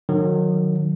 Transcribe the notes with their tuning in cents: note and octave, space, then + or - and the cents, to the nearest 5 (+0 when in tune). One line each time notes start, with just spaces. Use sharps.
D#3 -40 F#3 -25